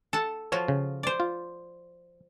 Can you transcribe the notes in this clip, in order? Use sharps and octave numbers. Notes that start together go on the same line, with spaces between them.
A4 F#5 A5
F3 F4 F#4 C#5
C#3
C5 D5
F4